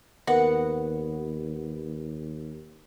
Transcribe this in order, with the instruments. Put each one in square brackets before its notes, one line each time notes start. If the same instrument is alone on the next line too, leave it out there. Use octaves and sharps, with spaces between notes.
[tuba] D#2 [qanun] B3 [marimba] A#4 [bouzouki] F#5